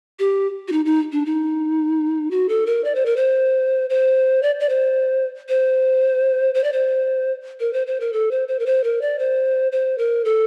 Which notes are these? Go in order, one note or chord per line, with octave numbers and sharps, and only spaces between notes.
G4
F#4
D#4
D#4
D4
D#4
F#4
A4
A#4
D5
C5
A#4
C5
C5
D5
D5
C5
C5
C5
D5
C5
A#4
C5
C5
A#4
A4
C5
C5
A#4
C5
A#4
D5
C5
C5
A#4
A4